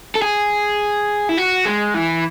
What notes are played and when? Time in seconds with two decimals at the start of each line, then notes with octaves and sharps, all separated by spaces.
0.15 A4
0.22 G#4
1.29 E4
1.37 F#4
1.65 G#3
1.94 E3